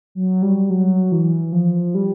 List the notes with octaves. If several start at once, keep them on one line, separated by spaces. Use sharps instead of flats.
F#3
G3
F#3
E3
F3
G3